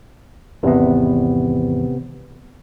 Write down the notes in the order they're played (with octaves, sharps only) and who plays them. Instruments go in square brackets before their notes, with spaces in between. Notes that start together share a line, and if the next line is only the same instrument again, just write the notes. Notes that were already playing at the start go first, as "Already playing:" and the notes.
[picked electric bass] G#1 E2 [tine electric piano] C3 B3